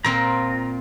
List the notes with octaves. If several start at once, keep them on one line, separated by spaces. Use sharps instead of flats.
A#2 C4 F4 A#5